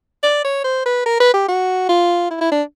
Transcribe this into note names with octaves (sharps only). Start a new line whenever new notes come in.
D5
C#5
C5
B4
A#4
B4
G4
F#4
F4
E4
E4
D4